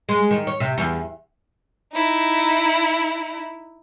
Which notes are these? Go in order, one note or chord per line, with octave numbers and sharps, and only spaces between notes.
G#3
D#3
C#5
C3
E2
D#4 E4